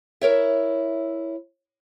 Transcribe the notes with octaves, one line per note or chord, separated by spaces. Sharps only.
E4 A#4 C#5 E5